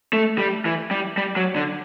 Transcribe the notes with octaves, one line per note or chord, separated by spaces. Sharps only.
A3
G3
E3
G3
G3
F#3
D3